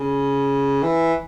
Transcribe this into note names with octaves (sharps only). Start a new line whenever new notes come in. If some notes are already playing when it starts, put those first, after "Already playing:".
Already playing: C#3
E3